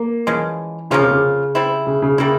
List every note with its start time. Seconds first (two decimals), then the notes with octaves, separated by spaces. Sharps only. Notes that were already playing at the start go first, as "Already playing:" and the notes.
Already playing: A#3
0.27 C#3 E3 F3 G#3
0.91 C#3 F3 A#3 C#4 F4
1.01 C3
1.11 C#3
1.55 G3 C4 E4
1.87 C#3
2.02 C#3
2.18 C#3 G3 A#3 E4